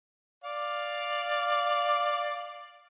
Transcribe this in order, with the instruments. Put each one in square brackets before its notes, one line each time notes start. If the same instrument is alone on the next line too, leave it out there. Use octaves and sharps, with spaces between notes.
[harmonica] D5 F5